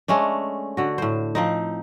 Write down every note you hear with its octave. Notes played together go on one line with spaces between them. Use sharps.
G#3 A3 C#4 D4
D3 F#4
A2 C5
F3 C4 D#4